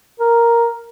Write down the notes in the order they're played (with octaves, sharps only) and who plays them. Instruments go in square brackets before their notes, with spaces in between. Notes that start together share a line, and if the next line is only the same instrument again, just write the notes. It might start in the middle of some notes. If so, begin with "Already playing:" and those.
[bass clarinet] A#4